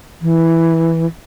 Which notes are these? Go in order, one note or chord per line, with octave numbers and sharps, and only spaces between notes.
E3